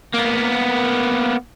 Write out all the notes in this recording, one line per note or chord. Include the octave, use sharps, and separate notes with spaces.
A#3 B3